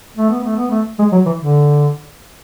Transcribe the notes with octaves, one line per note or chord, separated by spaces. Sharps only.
A3
B3
A3
B3
A3
G#3
F#3
E3
D3